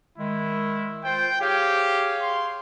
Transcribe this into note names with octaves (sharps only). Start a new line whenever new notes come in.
D#3 G#3 E4
F4 C5 G5
G4 G#4 C#5 F5
C6